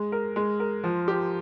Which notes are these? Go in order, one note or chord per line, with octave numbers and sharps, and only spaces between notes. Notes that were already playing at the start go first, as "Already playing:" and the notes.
Already playing: G#3
A#4
G#3
A#4
F3
G4